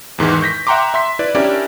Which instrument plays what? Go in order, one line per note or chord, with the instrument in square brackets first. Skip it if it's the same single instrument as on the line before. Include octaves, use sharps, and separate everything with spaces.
[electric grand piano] E2 G#2 D#3 E3
C#6 G6 A#6 B6
E5 F#5 G5 A#5 C6 D6
E5 C6 B6
E4 B4 D5
C#4 D4 E4 G4 A#4 D5